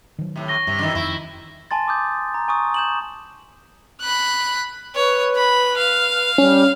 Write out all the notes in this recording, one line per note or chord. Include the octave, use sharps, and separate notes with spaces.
D#3 F#3
A2 C3
C#6 A#6 G7
G2 C3
F#2 D#3 E3
F2 D#3 C4 E4
G#5 A5 C6 A6
D6 D#6 G6
A#5
G#5 C#6 D#6
G6 E7 F#7
B5 F#6
B4 C#5
B5
F5
G3 C#4